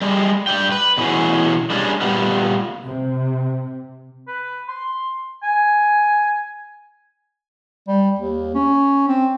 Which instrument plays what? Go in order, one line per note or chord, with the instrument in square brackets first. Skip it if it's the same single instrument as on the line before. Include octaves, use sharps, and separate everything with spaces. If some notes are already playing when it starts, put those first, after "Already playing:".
[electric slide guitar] G3 G#3
G2 F3 D5 G5
B4
B2 E3 C#4 G#4
G3 G#3 C#4 D4
A#2 G3 B3
[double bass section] C3
[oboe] B4
C6
G#5
[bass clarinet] G3
D#2
C#4
C4